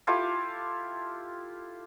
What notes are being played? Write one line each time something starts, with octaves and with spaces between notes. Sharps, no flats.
E4 F4 G4 A4